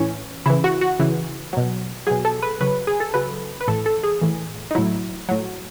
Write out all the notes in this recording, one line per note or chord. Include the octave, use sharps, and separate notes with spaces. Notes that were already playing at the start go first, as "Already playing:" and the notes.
Already playing: A2 E3 C#4
C#3 E3 E4
F#4
F#4
C#3 E3
B2 F#3
B2 F#3 G#4
A4
B4
C#3 F#3 B4
G#4
A4
C#3 F#3 B4
B4
A2 E3 A4
A4
G#4
A2 E3
D#4
A2 F#3 E4
A2 F#3